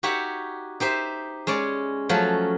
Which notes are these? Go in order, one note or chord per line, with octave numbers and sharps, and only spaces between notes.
D#4 F#4 G4 C#5 E5 F#5
D#4 G4 C5 E5
G#3 C#4 C#5 D5
F3 F#3 A3 C#4